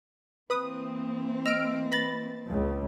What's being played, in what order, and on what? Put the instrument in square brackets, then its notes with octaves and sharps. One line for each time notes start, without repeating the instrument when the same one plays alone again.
[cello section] E3 A#3 C4 [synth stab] B4 D#6
[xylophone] D#5 A#6 F7 [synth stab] E6 F6 D7
[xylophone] B4 A#6 F#7 [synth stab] B5 A6
[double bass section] C#2